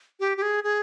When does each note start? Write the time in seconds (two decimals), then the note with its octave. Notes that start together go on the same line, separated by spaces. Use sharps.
0.20 G4
0.37 G4
0.42 G#4
0.64 G#4